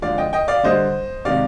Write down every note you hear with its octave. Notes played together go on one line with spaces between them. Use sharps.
D3 F3 G#3 D5 F5
D#5 G5
D#5 G5
D5 F5
D3 G3 C5 D#5
C3 D#3 G#3 D5 F5